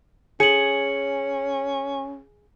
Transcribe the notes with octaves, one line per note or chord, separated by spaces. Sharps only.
C#4 G#4 C#7 F#7